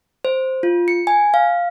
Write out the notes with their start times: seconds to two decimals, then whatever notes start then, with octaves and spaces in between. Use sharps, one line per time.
0.25 C5
0.63 F4
0.88 C#7
1.07 G#5
1.34 F5